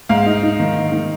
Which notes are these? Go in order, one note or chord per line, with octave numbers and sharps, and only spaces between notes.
G#2 F5
D#4
D#4
D#3
G#2
D#3